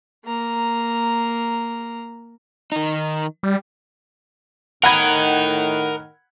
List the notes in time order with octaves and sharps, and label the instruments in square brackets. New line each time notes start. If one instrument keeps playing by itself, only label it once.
[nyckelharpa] A#3 A#5
[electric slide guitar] D#3 D#4
[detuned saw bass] G3
[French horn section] A2 D#3 [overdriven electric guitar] A#4 D#5 [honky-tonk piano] F#5 B5 G#6